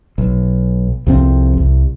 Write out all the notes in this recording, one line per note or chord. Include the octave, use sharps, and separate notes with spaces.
B1
C2 F2 C4
C2